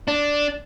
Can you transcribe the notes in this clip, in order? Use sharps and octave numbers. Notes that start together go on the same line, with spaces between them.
D4